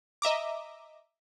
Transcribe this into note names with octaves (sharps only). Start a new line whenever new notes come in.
D#5 E5 A#5 D6